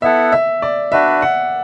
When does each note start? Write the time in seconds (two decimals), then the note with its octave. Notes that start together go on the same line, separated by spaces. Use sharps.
0.02 B3 E4 A4 E5 F#5
0.32 E5
0.62 D5
0.92 D4 F#4 B4 E5
1.22 F#5